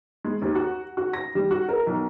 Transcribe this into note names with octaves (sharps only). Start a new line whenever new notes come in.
G#3
D#2
F#4
F#4
A#6
G3
F#4
A#4
B1